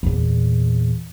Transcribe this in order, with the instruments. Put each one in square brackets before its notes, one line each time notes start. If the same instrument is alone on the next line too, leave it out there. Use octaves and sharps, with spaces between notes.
[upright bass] E2 A#2